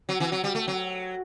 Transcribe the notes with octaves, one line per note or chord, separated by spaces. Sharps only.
F#3
E3
F#3
G3
A3
F#3